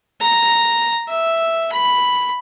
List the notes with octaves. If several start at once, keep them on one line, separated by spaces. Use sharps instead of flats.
A#5
E5
B5